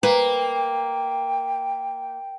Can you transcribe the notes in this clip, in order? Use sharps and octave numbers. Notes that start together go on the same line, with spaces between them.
A#3 B4 G5